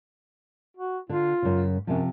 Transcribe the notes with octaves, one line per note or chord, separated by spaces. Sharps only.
F#4
D3 F4
F#2 C#3
F#2 C3 F3